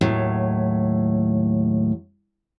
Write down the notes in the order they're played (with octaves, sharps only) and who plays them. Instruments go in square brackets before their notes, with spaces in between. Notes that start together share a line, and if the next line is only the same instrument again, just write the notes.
[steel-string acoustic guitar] D#2 A2 F#3